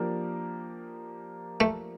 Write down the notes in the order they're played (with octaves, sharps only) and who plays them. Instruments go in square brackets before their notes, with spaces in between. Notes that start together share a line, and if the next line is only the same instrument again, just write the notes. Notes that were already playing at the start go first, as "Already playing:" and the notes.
Already playing: [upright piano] F3 A#3 D4 G4 A#4
[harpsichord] A3